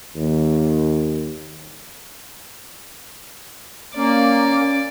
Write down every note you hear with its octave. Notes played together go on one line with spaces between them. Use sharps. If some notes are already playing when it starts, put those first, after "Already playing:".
D#2
A#3 C#4 D5